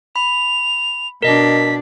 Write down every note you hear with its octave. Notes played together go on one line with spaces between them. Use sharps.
B5 F7
B2 D4 A#4 D#5 B6